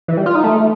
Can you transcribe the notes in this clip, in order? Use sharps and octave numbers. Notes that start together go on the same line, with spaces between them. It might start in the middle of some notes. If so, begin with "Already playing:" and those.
E3
G3
F4
D#4
A3